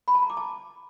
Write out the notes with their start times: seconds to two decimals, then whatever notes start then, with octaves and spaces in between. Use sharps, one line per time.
0.08 B5
0.15 A5
0.22 A#5
0.30 D6
0.37 A5